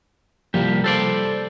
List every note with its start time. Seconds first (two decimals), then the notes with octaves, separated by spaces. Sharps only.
0.54 C2 F3 G3 A#3 G4
0.84 A4 C5 D5